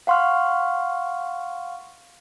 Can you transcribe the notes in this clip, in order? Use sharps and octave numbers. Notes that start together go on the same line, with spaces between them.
F5 F#5 C6 C#6 F6